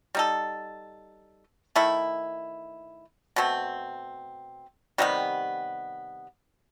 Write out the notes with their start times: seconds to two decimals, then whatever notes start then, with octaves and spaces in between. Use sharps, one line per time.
0.15 G3 D#4 A4
1.76 D#3 A3 E4
3.36 B2 A3 C4
4.98 C3 D#3 G3 B3